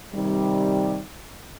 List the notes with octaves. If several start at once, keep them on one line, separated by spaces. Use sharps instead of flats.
C3 D#3 G3